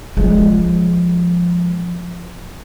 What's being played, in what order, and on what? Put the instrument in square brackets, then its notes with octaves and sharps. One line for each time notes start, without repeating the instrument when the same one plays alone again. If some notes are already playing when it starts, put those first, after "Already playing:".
[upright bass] F3 G#3